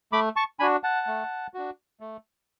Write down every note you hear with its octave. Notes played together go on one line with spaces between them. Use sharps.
A3 B5 D6
A5 C#6
D4 F#4 G#5 B5
F#5 A5
A3
D4 F#4
A3